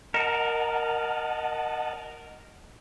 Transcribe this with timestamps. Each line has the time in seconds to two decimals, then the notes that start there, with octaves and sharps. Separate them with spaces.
0.14 A#4 D#5 F#5 A5